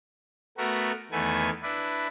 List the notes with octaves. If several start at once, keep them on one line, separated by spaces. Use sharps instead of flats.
A3 B3 F#4 A#4
E2 D#3 A3 B3 G#5
D4 E4 B4